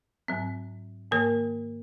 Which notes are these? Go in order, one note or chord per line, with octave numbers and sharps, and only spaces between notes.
G#2 F#3 C4
G#2 D#3 A#3 A#4